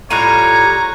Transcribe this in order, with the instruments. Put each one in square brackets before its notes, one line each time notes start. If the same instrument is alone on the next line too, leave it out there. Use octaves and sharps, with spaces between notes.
[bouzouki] A2 G3 F4 [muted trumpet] C#5 [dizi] A#5 [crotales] F#6 D#7